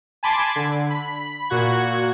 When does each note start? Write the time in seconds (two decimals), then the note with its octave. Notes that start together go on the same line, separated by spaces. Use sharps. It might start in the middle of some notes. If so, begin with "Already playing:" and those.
0.23 G#5 A5 B5 C6 D6 G#6
0.56 D3
0.90 B5
1.50 A#2 F#4 F#5 G#6